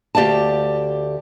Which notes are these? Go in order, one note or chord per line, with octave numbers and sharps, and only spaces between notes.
D2 G4 D5 F5 A5